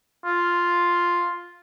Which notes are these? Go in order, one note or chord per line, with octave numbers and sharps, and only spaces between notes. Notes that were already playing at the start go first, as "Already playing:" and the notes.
F4